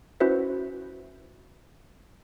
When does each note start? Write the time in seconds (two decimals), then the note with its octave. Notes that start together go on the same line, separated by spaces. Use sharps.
0.20 C#4 E4 F#4 B4 C5 E5